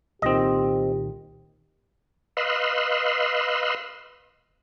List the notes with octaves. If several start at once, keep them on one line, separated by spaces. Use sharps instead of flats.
C2 A#2 D#3 C4 G4 D#5
B4 D#5 F5 C6 E6 F#6